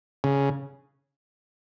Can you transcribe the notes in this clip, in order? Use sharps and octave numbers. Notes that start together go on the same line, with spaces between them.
C#3